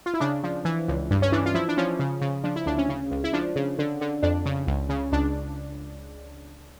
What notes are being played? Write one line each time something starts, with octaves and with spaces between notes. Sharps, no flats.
F4
E4
C#3 D4
F3
E3
C#2
G2
C#4
E3 D4
F4
F3 E4
D4
F3 C#4
C#3
C#3
F3 D4
E4
D2 D4
C#4
C#3
C#2
E4
F3 D4
C#3
D3
D3
F2 D4
C#3
C#2
C#3
C#2 D4